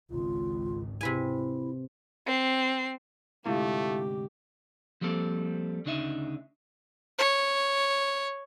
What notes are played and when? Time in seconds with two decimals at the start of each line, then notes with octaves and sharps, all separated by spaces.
0.11 G#1 C#2 F4
1.01 C3 E4 B4 G#5
2.27 C4 C7
3.46 D2 G#2 C3 A3 E4 F4 G4 F5
5.01 F3 G3 A#3 C4 A4
5.85 D2 C#3 D4 D#4 E5
7.19 C#5